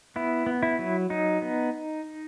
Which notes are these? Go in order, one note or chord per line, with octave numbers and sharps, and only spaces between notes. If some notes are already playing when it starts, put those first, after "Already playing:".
B3 E4
B3
E4
F#3
F#3 D#4
B3